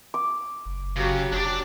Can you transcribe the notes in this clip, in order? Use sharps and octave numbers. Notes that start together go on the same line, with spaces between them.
D6
F#1
C#3 F#3 G4
F1 D4 D5